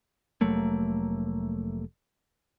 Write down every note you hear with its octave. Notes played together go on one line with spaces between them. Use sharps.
F1 F#3 A3 A#3